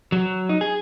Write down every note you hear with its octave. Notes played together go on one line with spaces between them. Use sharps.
F#3
D#4
G#4